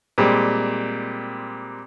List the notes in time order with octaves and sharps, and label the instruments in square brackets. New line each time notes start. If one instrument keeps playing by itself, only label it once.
[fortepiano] A#2 G3 G#3 C4